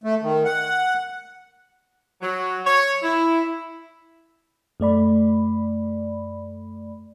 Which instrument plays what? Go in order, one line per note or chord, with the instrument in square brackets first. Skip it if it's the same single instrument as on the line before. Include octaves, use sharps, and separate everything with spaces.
[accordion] A3
D#3
F#5
[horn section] F#3
C#5
E4
[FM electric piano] F#2 A3 D5 B5